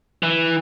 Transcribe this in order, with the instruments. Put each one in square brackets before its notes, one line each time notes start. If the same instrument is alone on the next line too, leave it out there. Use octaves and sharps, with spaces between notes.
[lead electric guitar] E3